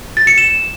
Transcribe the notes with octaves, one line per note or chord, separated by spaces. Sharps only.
A6
C#7
E7